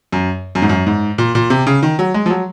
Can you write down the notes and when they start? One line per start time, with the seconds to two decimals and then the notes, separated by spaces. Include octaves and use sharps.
0.13 F#2
0.55 F#2
0.62 G#2
0.69 F#2
0.87 G#2
1.18 A#2
1.35 A#2
1.50 C3
1.67 C#3
1.83 D#3
1.99 F#3
2.14 G#3
2.26 F3
2.30 F#3